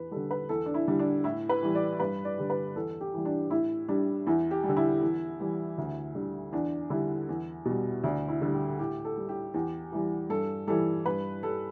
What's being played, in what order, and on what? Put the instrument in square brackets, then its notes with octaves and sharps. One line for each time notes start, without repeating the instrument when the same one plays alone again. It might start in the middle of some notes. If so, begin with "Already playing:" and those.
Already playing: [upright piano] E2 B4
D3 G3 A4
B4
E2 A4
D4
E4
D3 G3
D4
A2 E4
B4
E3 G3
D5
G2 B4
D5
D3 G3
B4
E2 A4
G4
E3 G3
D4
A2 E4
G3 D4
E2 E4
G4
G3
D3
E4
E2
E3 G3
D2
D3 G3
E2 D4
D3 G3 E4
E2
B2 G3
D2 D4
E4
D3 G3
G4
A2 G4
A4
G3
G4
E2 G4
E3 G3
G2 A4
E3 G3 A4
G2 B4
G3 A4